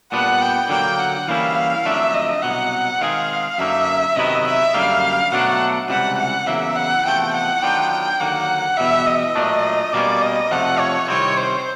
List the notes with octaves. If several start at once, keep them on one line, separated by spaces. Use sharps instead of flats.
A#2 G3 B3 D4 F#5
G5
D3 F#3 A#3 G5
F#5
E3 G3 A#3 C#4 E4 F5
F2 D3 F#3 A3 D4 E5
D#5
C2 B2 F#3 F#5
D#3 G#3 C4 D#4 G#4 F5
F#2 D3 F#3 A#3 D#4 E5
C3 D#3 F#3 B3 E4 D#5
E5
F#2 D3 G3 A#3 F5
B2 F#3 A3 D4 F#5
C#2 C3 E3 G3 F#5
F#5
E2 C#3 F#3 A#3 E5
F#5
E2 C3 F3 A3 G5
F#5
D#3 F#3 B3 D4 F4 G5
G5
D#2 D3 F#3 A#3 F#5
E2 B2 G3 E5
D#5
A#2 F#3 A3 D4
B2 G3 A#3 C#4 D5
D#5
F2 C3 F3 A3 F#5
C#5
C2 C3 D#3 G3 C4 C#5
C5